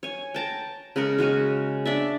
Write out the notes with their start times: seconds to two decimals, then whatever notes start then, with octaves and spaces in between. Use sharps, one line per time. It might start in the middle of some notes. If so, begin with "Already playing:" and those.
0.03 C#5 G#5
0.34 G5 A5 A#5
0.96 C#3 G#3 A#4 C#5
1.18 G#3 F#4 C#5 G#5
1.86 D4 D5 E5